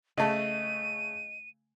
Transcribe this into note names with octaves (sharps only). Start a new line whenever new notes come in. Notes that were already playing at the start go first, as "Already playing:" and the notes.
C#3 A3 D#5 A5 D#7